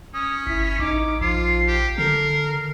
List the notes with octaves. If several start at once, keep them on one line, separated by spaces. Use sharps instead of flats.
C#4 D#6
G1 E4 B6
A1 D#4 D6
A#1 F3 F4 C7
G4
D3 A4 A#4 C7